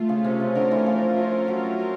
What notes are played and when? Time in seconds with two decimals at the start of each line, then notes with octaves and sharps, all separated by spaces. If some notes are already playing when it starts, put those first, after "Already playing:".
Already playing: A3 F4
0.09 C#3
0.24 C3 C#4
0.40 C#3
0.55 D3 A#4
0.71 E3
0.86 F3 A3
1.17 F3 F4
1.48 F#3 C#4
1.78 A#4